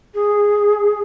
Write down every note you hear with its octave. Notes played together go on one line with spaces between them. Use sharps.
G#4